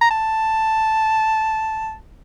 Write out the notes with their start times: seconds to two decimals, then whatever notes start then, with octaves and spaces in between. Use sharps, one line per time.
0.01 A#5
0.11 A5